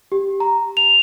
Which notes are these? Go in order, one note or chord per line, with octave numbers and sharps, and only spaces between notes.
G4
A#5
F7